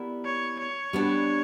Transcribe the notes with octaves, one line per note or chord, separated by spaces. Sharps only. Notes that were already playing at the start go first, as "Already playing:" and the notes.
Already playing: B3 E4 G4 A#4 D5
C#5
C#5
G3 B3 D4